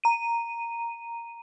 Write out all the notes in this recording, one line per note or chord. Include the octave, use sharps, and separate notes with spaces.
A#5 D#7